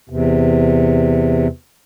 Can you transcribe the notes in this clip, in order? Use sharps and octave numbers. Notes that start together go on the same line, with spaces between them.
E2 C3